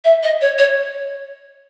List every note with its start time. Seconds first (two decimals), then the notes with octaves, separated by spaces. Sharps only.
0.05 E5
0.23 D#5
0.41 C#5
0.58 C#5